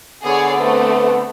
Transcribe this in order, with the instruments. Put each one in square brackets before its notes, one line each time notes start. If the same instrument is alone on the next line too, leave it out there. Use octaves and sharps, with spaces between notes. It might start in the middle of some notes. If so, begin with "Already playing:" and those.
[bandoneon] D3 B3 [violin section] G#4 C#5 D5
[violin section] A3 C4 [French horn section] B4